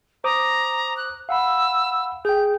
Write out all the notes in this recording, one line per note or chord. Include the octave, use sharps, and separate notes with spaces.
C5 A#5 D6 D#6
F#6
F5 F#5 B5 E6
G#4 G5 G6